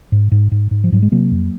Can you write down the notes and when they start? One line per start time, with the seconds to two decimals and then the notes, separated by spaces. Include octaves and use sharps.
0.12 G#2
0.32 G#2
0.52 G#2
0.71 G#2
0.84 F3
0.92 G#2 F#3
1.02 G#3
1.12 C3 F#3 A#3
1.31 F2